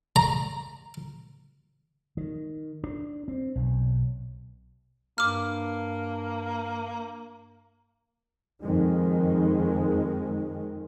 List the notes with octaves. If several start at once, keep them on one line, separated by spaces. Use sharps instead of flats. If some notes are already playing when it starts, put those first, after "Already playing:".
A#5
D#3
D4
C4
B1
G2 A#3 D6 F6
F2 D#3 G#3